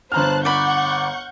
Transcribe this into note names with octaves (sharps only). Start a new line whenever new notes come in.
G1 C5 A5 A#5 F6 F#6
D5 F#5 B5 C#6 G6